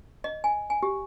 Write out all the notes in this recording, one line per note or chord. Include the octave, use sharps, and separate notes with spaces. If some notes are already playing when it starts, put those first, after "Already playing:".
D#5
G#5
G#5
G4